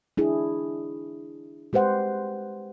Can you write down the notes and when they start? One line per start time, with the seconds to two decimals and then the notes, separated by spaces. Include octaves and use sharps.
0.17 D4 E4 G#4
1.73 G#3 G4 B4 C5 F#5